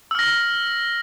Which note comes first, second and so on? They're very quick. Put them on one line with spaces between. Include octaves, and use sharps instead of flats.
E6 F6 A#6